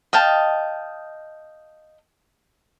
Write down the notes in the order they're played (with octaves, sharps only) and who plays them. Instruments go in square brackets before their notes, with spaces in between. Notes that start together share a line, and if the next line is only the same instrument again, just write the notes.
[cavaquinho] D#5 F5 G5 A5